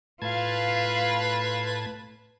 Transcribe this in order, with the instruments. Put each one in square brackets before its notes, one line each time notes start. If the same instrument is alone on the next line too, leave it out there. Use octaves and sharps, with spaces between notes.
[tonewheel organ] A2 A5 G#6 [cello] F4 F5 [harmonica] B4